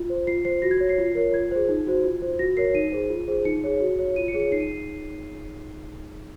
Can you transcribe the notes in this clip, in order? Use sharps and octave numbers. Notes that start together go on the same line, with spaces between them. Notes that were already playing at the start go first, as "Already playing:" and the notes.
Already playing: F4
C5
F4 C7
C5 C7
F#4 A#6
G#6
C#5
C7
F4
A#4 C#5
F4 G#6
G#4 C5
D#4
F#4 C5
F4
C5
F#4 A#6
A#4 C#5 C7
D#4 D#7
G#4 C5
F4
G#4 C5
D#4 C#7
G#4 C#5
F#4
C#5
F4 D#7
C#7
G#4 C#5
C#7
D#4 C7
D#7